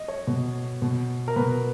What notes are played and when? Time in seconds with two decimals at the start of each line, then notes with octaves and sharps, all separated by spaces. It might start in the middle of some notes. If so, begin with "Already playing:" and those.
Already playing: D#5
0.08 C#5
0.27 B2
0.82 B2
1.28 A#4
1.36 B2 B4